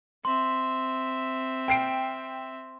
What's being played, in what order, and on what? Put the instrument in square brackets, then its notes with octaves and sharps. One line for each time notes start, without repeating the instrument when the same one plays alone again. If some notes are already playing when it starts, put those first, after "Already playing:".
[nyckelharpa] C4 E5 [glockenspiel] C6
[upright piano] G5 C7 D7